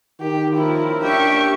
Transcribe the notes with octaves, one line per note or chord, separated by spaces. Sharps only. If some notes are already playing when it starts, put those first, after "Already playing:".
D#3 G4
F3 A#3 C#4 E4 A#4
D4 G4 E5 C#6